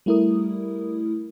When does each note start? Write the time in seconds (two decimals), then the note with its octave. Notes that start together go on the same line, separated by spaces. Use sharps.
0.06 G3 A3 E4 A#4 D#6